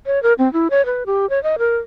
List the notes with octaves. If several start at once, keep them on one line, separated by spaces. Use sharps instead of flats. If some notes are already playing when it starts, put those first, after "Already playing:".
C#5
A#4
C4
E4
C#5
B4
G4
C#5
D#5
A#4